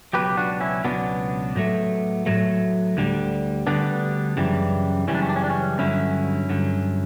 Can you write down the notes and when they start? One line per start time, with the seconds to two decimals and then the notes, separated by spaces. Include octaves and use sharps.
0.13 C#2 B2 F#3 G4 B4
0.37 D4 F#4
0.60 C#4 E4
0.84 C#2 B2 F#3 B3 D4
1.56 A2 F#3 A3
2.26 A2 F#3 A3
2.97 D2 D3 G3
3.67 D2 D3 G3 B3 D4
4.37 F#2 C#3 E3 G3
5.08 F#2 C#3 E3 G3 C#4
5.15 D4
5.22 C#4
5.29 D4
5.36 C#4
5.44 D4
5.50 C#4
5.78 G2 D3 F#3 C#4 E4
6.50 G2 D3 F#3